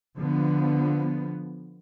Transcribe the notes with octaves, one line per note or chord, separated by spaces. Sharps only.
D3 F3 B3